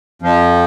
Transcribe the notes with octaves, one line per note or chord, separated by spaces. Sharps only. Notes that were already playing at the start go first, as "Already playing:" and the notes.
F2 F3